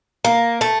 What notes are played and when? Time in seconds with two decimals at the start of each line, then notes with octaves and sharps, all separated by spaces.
0.25 A#3
0.61 A3